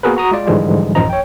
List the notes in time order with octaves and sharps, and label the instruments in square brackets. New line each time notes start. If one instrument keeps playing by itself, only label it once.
[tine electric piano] A#3 B3 F#4 G#4 A#4 B4
F#4 A#5 D#6
G#3 F4 D5
G#2 D3 E3 F3 G3 G#3
A1 F#2 D#3 F3 D#5 A#5
C#5 G5